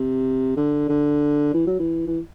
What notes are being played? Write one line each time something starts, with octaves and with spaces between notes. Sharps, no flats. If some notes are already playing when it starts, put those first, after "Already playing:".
Already playing: C3
D3
D3
E3
F#3
E3
E3